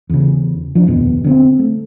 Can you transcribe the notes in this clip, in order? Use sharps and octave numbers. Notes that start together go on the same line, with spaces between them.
E2 C#3
F3 D4
F1 A#1 D#2 B2
D3 B3 C4
A3